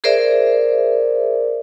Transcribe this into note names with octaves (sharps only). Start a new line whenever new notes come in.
G#4 A#4 C5 D5 E5